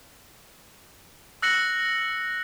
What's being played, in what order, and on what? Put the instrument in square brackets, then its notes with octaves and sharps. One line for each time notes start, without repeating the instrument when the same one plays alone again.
[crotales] E6 F#6 A#6 C#7 F#7